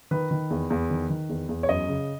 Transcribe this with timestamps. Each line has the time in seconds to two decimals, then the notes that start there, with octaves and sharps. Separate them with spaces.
0.11 D#3 B4
0.31 D#3
0.50 E2
0.70 E2
0.90 D#3
1.10 D#3
1.29 E2
1.49 E2
1.63 C#5
1.69 F#2 D#5
1.89 C#3